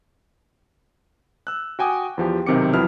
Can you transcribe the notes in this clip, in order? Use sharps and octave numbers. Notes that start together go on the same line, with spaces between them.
E6 F#6
F#4 G5 G#5 D6 D#6
E2 F3 G4
B1 C3 D#3 C4 D6 C#7
F2 F#3 E4 B4 D#6 F6